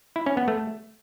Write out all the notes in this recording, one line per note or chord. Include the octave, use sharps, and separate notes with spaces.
E4
C#4
B3
A3